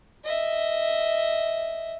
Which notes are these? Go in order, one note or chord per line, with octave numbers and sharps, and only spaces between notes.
D#5 E5